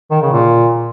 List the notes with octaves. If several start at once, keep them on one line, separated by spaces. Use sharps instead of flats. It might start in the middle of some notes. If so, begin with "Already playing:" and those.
D#3
C#3
A#2